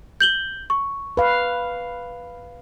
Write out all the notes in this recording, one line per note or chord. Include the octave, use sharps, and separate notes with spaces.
G6 F#7 G7
C#6
B4 F5